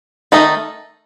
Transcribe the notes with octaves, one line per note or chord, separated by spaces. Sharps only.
D#3 A3 D#4